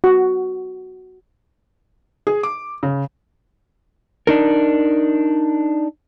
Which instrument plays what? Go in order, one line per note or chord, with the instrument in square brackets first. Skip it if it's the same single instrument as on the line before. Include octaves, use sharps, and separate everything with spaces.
[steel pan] F#4
[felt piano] G#4
D6
C#3
[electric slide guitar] D4 D#4 A#4